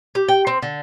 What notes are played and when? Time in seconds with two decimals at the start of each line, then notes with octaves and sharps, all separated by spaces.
0.15 G4
0.29 G5
0.47 C4
0.62 D3